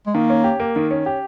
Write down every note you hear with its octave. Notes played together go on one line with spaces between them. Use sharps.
G#3
D#3 A#3
C#4
G4
A#3
D#3
C#4
G4